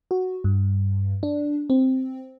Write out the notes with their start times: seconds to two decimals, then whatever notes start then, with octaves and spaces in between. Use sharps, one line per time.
0.11 F#4
0.44 G2
1.23 D4
1.70 C4